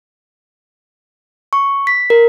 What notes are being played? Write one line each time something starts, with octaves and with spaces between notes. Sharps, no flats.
C#6
B6
A#4